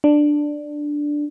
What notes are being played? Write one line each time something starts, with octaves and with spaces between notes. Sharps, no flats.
D4